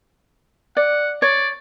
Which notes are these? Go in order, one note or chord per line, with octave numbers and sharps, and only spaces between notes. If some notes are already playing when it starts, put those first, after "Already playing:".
D5 F#5
C#5 D5